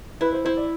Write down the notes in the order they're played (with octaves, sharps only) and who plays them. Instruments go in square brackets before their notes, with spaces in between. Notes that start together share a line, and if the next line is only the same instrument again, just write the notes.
[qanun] E4 [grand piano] B4
[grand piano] C5
[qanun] E4 [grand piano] C5
[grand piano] D5